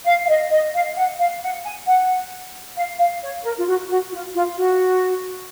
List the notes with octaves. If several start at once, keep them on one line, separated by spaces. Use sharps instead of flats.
F5
F5
D#5
D#5
F5
F#5
F5
F#5
G#5
F#5
F5
F5
C#5
A#4
F4
F#4
F#4
F4
F4
F#4